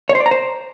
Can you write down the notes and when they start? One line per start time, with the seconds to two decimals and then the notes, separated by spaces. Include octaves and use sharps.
0.09 C#5
0.15 C5
0.20 D5
0.26 A#5
0.31 C5